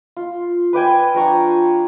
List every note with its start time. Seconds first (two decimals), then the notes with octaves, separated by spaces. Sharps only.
0.17 F4
0.73 B4 D5 G5 G#5
1.14 F3 D4 A#5 C#6